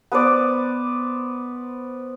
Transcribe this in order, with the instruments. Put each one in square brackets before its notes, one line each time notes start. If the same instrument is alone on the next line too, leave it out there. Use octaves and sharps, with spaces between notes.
[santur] B3 B4 C5 D5